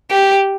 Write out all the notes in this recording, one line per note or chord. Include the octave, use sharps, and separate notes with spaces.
G4